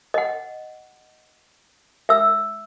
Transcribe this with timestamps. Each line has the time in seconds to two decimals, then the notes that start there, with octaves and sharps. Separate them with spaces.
0.14 D#5 F#5
2.09 E5 E6